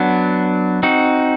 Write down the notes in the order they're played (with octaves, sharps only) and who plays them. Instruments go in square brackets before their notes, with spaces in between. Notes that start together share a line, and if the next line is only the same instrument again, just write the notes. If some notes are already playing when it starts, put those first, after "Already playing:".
Already playing: [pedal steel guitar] F#3 B3 D4
C4 D#4 F#4